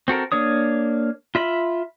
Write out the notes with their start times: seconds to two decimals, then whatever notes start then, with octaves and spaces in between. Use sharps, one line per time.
0.08 C4 F#4 A4 A#4
0.32 A#3 D4 C#5 D#6
1.35 F4 E5 B5